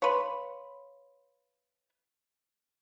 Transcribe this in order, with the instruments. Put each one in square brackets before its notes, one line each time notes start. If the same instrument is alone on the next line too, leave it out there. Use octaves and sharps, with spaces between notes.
[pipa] B4 C#5 [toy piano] F5 B5 C6